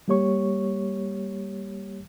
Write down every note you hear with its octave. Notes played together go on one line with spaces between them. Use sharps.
G3 A#3 G4 C#5 C#6